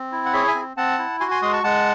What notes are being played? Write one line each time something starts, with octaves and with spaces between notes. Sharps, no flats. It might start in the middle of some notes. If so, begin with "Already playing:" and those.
Already playing: C4
E4
F#5
G#4 C#5 E5
E5 G#5
C4
C4 F#5 A5
E4
F#4 G#5 C6
G#5 C6
G#3 C6 D#6
A5 C#6
G#3 F#5 A5